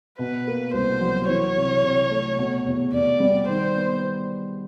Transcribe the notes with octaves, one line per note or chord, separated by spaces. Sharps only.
B2 B4
A#3
C2 C5
F#3
E3 C#5
C3
C3
A3
B2
E2
E2 D5
G3
D#3 C5
B3